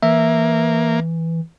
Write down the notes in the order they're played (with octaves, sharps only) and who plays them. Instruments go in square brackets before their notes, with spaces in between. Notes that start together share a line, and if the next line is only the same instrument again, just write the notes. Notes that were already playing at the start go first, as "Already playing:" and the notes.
[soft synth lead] E3 [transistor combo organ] A#3 [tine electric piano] E5